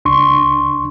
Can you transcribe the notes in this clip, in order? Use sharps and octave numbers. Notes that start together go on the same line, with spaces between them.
C#2 D4 C6 C#6